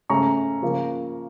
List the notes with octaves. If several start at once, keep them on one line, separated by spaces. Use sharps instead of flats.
C#3 A3 C#4 A#5 C#6
C#3 F3 A#3